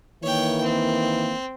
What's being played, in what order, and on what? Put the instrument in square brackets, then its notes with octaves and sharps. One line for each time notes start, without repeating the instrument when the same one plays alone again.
[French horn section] D#3 E3 A#3 [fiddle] C#5 G5
[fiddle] C4